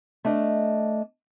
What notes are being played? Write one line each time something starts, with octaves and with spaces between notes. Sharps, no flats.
A3 D4 D#5